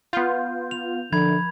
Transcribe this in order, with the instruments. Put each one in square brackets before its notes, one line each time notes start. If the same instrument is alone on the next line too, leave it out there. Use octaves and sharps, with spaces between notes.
[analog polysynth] B3 F4 [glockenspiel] G6
[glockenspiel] F7
[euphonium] D3 [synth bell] F3 [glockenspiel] B5 G#6 F7